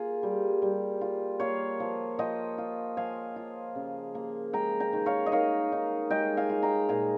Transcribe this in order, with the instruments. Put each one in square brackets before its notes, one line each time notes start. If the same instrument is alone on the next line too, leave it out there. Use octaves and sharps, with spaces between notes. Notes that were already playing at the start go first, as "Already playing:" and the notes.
Already playing: [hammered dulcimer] A#3 F4 G#4
G3
G3
F4
A#3 C#5 F5
F3
F3 D#5 G5
F4
F3 F5 G#5
F4
C#3
A#3
G#3 G5 A#5
G5 A#5
D#3
C#5 F5
D#5
D#3 C#5 F5
D#4
G#3 D#5 G5
F5 G#5
F4
G5 A#5
A#2 F5 G#5